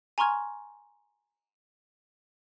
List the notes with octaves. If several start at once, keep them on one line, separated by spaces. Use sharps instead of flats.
G#5 A#5 C6 C#6 F6 G#6